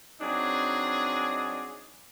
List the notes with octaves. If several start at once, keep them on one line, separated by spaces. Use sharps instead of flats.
F#3 C4 D4 D#4 G#4